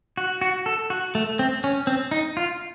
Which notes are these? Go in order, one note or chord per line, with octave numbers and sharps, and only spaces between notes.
F#4
F#4
A4
F#4
A3
C4
C#4
C4
D#4
F4